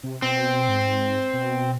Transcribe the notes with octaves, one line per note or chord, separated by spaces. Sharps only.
C3
B2 C4
G#2
B2